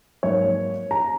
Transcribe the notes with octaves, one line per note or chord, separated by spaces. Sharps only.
G#2 F#3 A#3 C#5
A#5